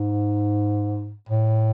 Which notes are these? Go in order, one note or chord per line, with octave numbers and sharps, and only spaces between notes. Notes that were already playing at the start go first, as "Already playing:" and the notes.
Already playing: G#2
A2